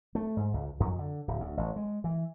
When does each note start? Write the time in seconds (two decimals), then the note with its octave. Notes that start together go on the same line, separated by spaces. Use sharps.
0.15 A3
0.37 G#2
0.53 C#2
0.80 F2
0.99 D3
1.28 D1
1.40 D2
1.57 A1
1.76 G#3
2.04 E3